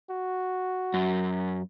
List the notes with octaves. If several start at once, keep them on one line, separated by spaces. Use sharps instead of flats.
F#4
F#2